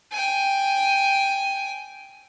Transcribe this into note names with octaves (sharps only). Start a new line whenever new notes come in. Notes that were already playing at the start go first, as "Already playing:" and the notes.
G5 G#5